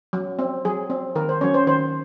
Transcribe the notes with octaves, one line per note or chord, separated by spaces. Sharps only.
F#3
C4
F#3 G#4
C4
D#3 A#4
C5
F#3 C#4 C#5
C5
D#3 C5